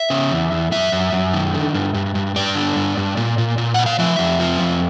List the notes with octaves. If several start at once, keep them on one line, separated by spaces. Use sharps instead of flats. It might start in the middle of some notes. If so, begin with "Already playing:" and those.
Already playing: E5
C#3
E2
E2
F#2 E5
F#2
F#2
D#3
D3
G2
G2
G2
G2 D5
D3
G2
G2
A#2
A#2
A#2
A#2 F#5
F5
F3 E5
F2
F3
F2